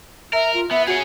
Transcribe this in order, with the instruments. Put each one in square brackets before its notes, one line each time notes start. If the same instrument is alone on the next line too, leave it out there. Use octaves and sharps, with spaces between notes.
[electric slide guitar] A#4 [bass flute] E5
[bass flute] F4
[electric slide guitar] B3 [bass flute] E5
[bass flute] F#4 [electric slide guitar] G#4 C#5